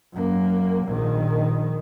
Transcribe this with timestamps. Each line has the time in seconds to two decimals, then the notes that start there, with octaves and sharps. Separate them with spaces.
0.13 F#2 A#3
0.85 A#1 D#3